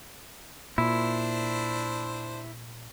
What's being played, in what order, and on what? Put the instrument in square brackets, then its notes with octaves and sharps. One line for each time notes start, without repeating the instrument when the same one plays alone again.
[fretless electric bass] A#2 [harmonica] D4 C5 [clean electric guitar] E4